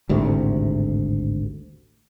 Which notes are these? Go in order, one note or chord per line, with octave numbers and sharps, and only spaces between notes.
G#1 D2 A2 C3